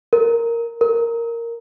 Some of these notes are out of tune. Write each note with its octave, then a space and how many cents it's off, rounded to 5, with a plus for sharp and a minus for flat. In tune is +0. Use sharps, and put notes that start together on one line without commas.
A#4 -5
A#4 -5